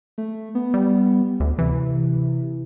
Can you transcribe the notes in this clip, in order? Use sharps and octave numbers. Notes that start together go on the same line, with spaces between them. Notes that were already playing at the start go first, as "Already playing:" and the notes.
A3
B3
G3
D2
C3 E3